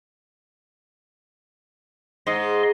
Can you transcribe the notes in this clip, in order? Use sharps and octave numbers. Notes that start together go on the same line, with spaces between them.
G#2 D#5 C6